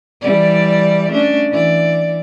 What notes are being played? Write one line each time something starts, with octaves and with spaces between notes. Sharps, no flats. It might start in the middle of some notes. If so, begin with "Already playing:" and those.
E3 G3 D5
A3 C#4 D4
E3 D5